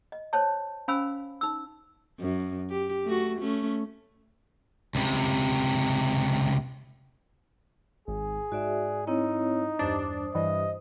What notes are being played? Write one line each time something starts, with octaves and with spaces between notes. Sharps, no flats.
D#5
C5 C#5 A5
C#4 C5 F5 G#5 B5 E6
D#4 E6
F#2
G4
A3 F#4
A3 C#4
C#2 C3
G#1 G#4
G#2 F#4 D5 E5
C4 D#4 E4 C#5
E2 G2 D4 C5 D#6
G2 E3 D#5